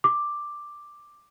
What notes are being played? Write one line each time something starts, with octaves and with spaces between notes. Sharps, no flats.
D6